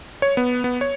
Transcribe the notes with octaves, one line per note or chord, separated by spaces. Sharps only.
C#5
B3
B3
C#5